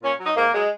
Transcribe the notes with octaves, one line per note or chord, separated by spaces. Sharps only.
A#2 C#4
F#3 D#4
G#2 A#3
F#3 G#3